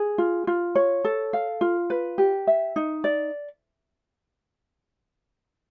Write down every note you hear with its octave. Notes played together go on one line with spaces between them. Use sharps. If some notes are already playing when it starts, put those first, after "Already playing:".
Already playing: G#4
F4
F4
C#5
A4
F5
F4
B4
G4
E5
D#4
D5